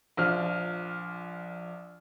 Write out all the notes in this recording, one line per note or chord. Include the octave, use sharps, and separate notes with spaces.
A#1 F3 F6